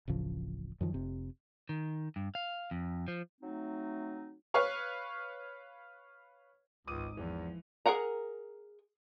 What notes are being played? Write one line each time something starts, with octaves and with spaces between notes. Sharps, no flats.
D1 A1 C#3 F3
F#2 D#3 F3
F1 C3
D#3
G2
F5
F2
F3
F#3 A3 C4 D#4
B4 C#5 F5 C#6
G#1 C#2 G#2 D6 D#6 D#7
E2 E3 F3
G#4 A#4 F#5 A#5